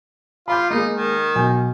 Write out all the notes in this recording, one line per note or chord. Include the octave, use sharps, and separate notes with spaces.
F4 B5 D6 G6
G#3 A#3 D#4 G#4
D#3
B1 G#5 G6